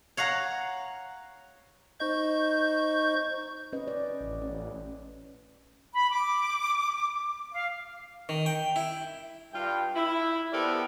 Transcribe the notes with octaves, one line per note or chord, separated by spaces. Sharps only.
C#5 F5 F#5 A#5
D#4 C5 D#5 C#6 G6
C#4 B4 D#5
D5
A1
C#4
B5
D6
F5
D#3
G5
E4
G2 F4 G5
E4
B3 G4 A4 A#4 C5 D5